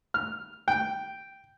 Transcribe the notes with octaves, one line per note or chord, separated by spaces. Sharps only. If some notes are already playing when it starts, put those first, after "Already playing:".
F6
G5